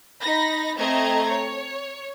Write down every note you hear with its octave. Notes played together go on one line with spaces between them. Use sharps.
D#4 B5 A#6
A3 C4 D#5 A#5 G#6
C#5